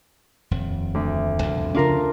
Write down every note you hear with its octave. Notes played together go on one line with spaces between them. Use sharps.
D#1 F2
D2
C2 F2 B2
C#3 C#4 D4 F4 A#4